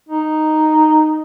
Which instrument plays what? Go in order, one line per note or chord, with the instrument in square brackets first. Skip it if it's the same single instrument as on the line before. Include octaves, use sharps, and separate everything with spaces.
[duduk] D#4